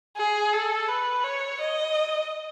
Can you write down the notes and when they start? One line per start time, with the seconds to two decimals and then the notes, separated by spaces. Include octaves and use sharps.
0.17 G#4
0.53 A4
0.88 B4
1.24 C#5
1.61 D#5